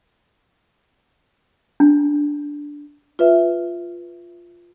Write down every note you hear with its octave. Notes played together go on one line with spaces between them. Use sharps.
D4
F4 B4 E5